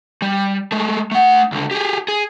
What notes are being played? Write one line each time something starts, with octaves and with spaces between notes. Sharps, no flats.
G3
G#3 A3
A3 F#5
C#2 D3
G4 G#4
G#4